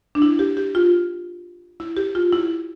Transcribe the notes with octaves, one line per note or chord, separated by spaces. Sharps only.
D4
E4
G4
G4
F4
E4
G4
F4
E4